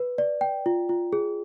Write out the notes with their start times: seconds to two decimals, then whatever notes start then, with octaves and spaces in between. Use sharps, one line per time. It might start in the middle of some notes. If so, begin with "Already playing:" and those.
Already playing: B4
0.18 D5
0.41 G5
0.66 F4
0.89 F4
1.13 G#4